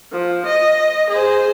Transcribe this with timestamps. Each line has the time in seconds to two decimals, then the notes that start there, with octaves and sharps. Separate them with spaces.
0.12 F3
0.45 D#5
1.09 G#4 C5